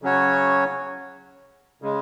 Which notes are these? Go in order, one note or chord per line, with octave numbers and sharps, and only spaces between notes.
C#3 F#3 C#4 F#4 C#5
C#3 G#3